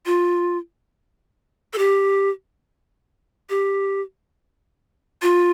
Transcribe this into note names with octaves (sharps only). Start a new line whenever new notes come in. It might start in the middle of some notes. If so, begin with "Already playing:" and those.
F4
A4
G4
G4
F4